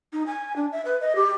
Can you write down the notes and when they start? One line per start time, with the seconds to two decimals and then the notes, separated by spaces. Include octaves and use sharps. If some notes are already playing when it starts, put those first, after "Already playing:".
0.13 D#4
0.27 G#5
0.56 D4
0.72 E5
0.85 B4
1.01 D#5
1.16 G4